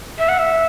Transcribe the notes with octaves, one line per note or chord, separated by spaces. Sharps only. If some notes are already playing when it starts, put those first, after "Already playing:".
E5
F#5
E5